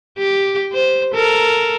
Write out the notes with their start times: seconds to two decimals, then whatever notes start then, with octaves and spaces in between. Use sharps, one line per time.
0.18 G4
0.73 C5
1.14 A4 A#4